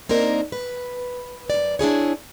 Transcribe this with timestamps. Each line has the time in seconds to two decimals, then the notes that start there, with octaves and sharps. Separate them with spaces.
0.09 A#3 C4 D4 D#4 A#4
0.52 B4
1.50 F#2 D5
1.79 D4 E4 G#4 C#5